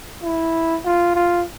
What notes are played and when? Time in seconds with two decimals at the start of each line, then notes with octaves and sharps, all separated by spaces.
0.23 E4
0.84 F4
1.15 F4